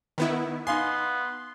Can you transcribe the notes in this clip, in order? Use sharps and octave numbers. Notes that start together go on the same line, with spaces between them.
D#3 B3 E4
B3 D#4 F5 G#5 C6